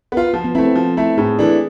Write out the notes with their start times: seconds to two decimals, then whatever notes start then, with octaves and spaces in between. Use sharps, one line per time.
0.12 B3 F4
0.34 F3 B3
0.45 B3
0.55 A3 C4 E4
0.65 A4
0.75 F3
0.97 A3 E4
1.18 A2 G#4
1.39 E3 A3 D4